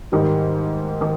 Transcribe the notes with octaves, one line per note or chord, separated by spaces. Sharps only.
G#2 D#3 G3
D#3